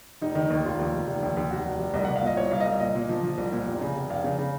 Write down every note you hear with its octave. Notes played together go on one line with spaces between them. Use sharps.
F1 D#4
D#3
D#2
F1 F4
D#2
F1
F1
D#2
D#2
F1 F#4
F1
F1
C2 D#5
C2 F#5
F5
A#2 D#5
C2 C#5
C2 F5
D#5
C2 F5
A#2 D#5
A#2
F3
F3
C2
A#2
F1
C#3
F1
F1 F5
C#3
C#3